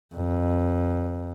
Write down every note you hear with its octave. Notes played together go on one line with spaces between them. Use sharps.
F2